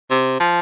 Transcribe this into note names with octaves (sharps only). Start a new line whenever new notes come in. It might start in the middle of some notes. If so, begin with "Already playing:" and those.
C3
F3